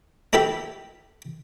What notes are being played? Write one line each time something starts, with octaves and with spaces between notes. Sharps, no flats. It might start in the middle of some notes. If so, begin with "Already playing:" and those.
D4 E4 G4 A4 E5